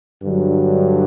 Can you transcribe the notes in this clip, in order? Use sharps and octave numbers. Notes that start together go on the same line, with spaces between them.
G2 D3 F#3